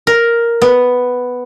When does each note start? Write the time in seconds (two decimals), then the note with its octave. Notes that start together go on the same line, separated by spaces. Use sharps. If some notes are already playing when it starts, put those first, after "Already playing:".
0.07 A#4
0.62 B3